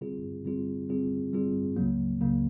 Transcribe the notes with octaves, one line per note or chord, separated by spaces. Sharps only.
D3 G3 C4 F4 G#4
D3 G3 C4 F4 G#4
D3 G3 C4 F4 G#4
D3 G3 C4 F4 G#4
C#2 C#3 F#3 A#3
C#2 C#3 F#3 A#3